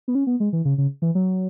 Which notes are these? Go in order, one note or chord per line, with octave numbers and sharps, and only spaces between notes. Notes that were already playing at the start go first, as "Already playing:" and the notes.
B3
C#4
B3
G#3
E3
C#3
C#3
E3
F#3